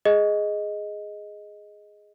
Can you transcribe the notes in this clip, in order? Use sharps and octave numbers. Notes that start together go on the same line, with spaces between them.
G#4 D#5